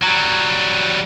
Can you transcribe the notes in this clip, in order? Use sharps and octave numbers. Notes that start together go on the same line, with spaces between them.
F#3 G3